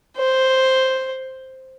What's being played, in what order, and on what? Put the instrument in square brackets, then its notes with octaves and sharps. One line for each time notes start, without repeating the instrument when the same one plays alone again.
[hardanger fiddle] C5